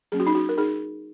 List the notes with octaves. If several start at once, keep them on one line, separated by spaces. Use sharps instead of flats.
F#3 A#3 C#4 G#4
F#4
D#4
F#4
A#4
D#4 G#4